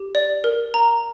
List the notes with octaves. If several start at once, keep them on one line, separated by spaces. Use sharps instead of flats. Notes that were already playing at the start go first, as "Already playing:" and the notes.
Already playing: G4
D5
A#4
A#5